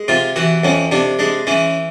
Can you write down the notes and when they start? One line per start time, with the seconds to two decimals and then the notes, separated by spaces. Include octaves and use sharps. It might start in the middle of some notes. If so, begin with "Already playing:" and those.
Already playing: G#3
0.08 C3 F4
0.36 E3 F#4
0.64 F2 C#4
0.91 C3 D4
1.19 G#3 D4
1.47 E3 C#4